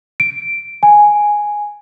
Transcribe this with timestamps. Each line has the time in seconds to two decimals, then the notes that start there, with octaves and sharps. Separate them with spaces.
0.20 D7
0.83 G#5